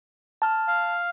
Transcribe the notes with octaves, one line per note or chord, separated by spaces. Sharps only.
A5 F6
F5